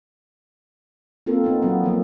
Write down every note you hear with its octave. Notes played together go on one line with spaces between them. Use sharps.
A#3 C4 F4 A4 A#4
A#3 B3 D#4
F#3 B3
F3 A#3 B3